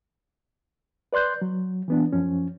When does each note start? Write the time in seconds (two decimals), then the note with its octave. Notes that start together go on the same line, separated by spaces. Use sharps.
1.13 B4 D5 C6 F#6 G6
1.42 F#3
1.88 E3 B3 D4
2.13 F#2 F3 C#4